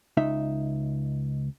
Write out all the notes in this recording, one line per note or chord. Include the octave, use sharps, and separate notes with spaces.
C#2 D#4 E5